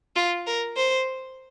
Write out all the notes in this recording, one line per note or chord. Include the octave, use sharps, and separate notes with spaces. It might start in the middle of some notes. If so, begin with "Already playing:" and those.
F4
A#4
C5